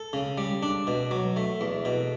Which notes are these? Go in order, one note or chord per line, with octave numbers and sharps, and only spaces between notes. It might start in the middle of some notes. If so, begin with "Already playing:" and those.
Already playing: A4
C#3
G3
D4
B2
F#3
A3
E2
B2